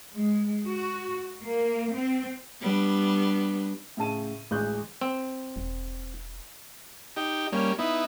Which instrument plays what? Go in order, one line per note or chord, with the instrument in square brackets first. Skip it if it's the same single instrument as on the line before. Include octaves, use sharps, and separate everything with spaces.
[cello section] G#3
F#4
A#3
C4
[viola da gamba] G3 B3 D4
[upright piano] A2 C#3 A5 D#7
A1 D2 D3 G#3 F#6 G6
[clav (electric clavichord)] C4
[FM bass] E1
[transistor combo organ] D#4 G4
G3 A#3 C#4
B3 D#4 E4